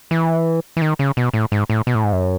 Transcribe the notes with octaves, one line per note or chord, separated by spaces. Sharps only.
E3
E3
D#3
C#3
B2
A2
G#2
A2
B2
A2
G#2
F#2